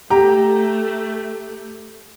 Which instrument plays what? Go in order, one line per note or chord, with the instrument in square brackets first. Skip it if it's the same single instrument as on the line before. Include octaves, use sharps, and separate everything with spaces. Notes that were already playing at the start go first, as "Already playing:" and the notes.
[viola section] A3 [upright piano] G4 A#5